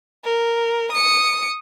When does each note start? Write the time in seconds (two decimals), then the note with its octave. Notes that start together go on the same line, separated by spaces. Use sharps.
0.24 A#4
0.92 D#6 C#7